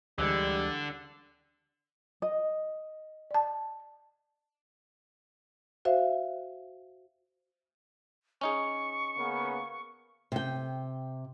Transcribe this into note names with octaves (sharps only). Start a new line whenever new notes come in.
D2 D3 E3 G3 G#3 E6 F#6 G#6
D#5
D5 A5
F#4 C5 E5 F5
C#4 D#4 G#4 C#6
C#3 A#3 B3
C3 G5